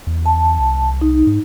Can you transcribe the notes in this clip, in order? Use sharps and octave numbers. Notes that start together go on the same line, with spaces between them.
E2
A5
C2
D#4
G#2